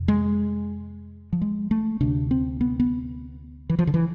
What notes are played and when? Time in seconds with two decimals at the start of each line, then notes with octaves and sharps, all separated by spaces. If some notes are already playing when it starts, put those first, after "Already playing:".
Already playing: F2 C3
0.08 G#3
1.33 F3
1.41 G#3
1.71 A3
2.00 D2 C3 D4
2.31 C4
2.61 B3
2.80 B3
3.70 E3
3.79 F3
3.87 D3
3.94 E3